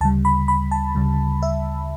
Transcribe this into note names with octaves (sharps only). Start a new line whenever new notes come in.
D2 C#3 G3 A5
B5
B5
A5
D2 C#3 G3
E5